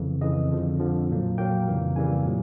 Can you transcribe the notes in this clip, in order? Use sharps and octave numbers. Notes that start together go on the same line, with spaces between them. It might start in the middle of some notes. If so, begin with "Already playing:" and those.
Already playing: F2 C#3 E3
F2 C#3 E3 D#5
F2 D3 F3
F2 D3 F3
A#2 F#3 A#3
A#2 F#3 A#3 G5
F2 C#3 E3 G3 A#3
F2 C#3 E3 G3 A#3 G#5
A#2 F#3